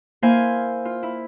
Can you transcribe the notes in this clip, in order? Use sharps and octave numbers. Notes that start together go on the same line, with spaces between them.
A#3 E4 C5 F5 G#5
F4
E4